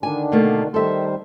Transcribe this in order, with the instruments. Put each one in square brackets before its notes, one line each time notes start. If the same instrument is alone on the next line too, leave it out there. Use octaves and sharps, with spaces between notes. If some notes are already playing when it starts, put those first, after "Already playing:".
[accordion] D3 D#3 D4 [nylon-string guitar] G#5
[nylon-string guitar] B2 A3 A#3
[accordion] D#3 G3 C5 [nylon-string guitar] A4 E5